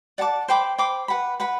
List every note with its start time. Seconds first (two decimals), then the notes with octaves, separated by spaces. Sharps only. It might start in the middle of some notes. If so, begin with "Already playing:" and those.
0.18 D5 F#5 A5 D6
0.48 C5 G5 B5 D6
0.78 C5 G5 B5 D6
1.08 B4 F#5 B5
1.40 B4 F#5 B5